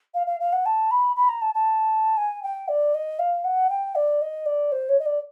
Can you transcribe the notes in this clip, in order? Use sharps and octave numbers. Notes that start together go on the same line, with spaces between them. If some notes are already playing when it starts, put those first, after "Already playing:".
F5
F5
F5
F#5
A5
B5
B5
A#5
A5
A5
G#5
G5
D5
D#5
F5
F#5
G5
D5
D#5
D5
C5
C#5
D#5
D5